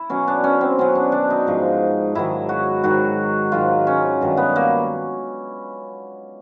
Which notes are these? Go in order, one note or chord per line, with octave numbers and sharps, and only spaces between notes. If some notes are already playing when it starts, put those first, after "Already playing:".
Already playing: E4
B2 F#3 C#4
D4
C#4
C4
B2 F#3 C#4
D4
D4
D#4
G#2 F3
G#2 D#3 F#3 E4
F#4
G#2 D#3 F#3 F#4
G#2 D#3 F#3 F4
C#4
G2 D#3 F#3
B3
A#3